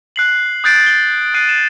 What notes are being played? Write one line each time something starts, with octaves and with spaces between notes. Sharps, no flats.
F#6 C7 F#7
D#6 F#6 G6 A6 C7 D7
F#7 G7
F#6 C7 D#7
E7